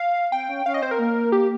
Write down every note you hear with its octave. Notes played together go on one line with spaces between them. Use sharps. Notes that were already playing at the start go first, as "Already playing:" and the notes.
Already playing: F5
C4 G5
C#4
C#4 F5
D#5
C4 C5
A#4
A#3
G4